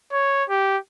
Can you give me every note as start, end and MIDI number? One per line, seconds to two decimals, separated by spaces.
0.12 0.44 73
0.49 0.77 67